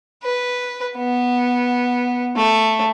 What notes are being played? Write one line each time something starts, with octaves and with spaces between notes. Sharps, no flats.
B4
B3
A3